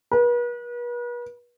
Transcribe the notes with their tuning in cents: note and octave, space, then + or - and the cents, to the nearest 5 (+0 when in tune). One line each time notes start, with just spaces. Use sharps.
B4 -40